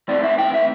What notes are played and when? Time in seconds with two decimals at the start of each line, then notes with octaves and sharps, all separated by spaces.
0.08 A2 E3 C4 E4 D5
0.24 E5
0.38 G5
0.54 E5